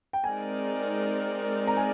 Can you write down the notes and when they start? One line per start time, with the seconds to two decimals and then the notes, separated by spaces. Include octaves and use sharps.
0.13 G5
0.24 G#3 C4 D#4 A#4 D5 G#5
1.67 A#5
1.77 G#5